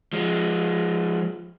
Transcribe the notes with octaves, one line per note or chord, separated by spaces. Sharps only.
F3 G#3